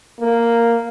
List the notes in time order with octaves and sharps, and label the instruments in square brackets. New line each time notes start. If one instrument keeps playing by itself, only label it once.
[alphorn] A#3